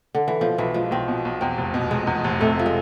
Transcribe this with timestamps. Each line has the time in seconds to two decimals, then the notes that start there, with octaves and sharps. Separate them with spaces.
0.15 D3
0.28 E3
0.41 B2 F3
0.58 B1 E3
0.74 F3 G#3
0.91 B1 C4
1.08 B2
1.25 B1
1.41 E2 C4
1.58 F1
1.74 B2
1.90 F1 G#3
2.07 E2
2.24 F1
2.41 C3 A3
2.59 F3
2.66 G#3